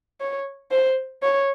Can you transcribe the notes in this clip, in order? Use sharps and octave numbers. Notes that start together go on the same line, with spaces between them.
C#5
C5
C#5